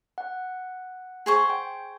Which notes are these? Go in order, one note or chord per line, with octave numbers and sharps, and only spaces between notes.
F#5
G#4 C5 C#6
G5